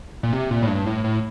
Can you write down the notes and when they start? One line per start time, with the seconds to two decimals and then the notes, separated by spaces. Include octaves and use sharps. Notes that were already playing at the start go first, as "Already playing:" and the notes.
0.23 A#2
0.33 C3
0.50 A#2
0.63 A2
0.68 G2
0.86 A2
1.05 A2